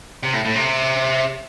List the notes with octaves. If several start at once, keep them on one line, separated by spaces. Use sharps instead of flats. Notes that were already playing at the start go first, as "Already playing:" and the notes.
C3
A2
A2
C3